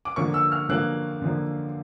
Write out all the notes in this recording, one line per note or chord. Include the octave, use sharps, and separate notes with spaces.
D6
D3 F3 A#3 C#6
E6
F6
D3 F3 A#3 F#6
D3 F3 A#3